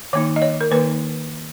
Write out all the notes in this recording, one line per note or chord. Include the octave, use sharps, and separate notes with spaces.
D#3 A#3 D#4 C#5
D#5
C#5
A#4
D#3 A#3 D#4 B4